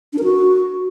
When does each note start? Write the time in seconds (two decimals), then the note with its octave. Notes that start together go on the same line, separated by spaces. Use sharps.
0.13 D4
0.18 A#4
0.23 F#4